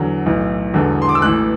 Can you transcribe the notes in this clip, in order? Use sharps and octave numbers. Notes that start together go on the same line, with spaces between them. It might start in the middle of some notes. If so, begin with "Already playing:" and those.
Already playing: E2 D3 F#3
B1 A2 E3
E1 E2 D3
C6
D6
E6
A1 A2 E3 F#6